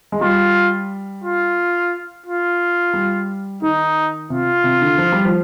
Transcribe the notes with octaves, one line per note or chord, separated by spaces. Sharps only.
G#3
G3 F4
F4
F4
G3
D#3 D#4
C3 F4
C3
D3
F3
G3
F3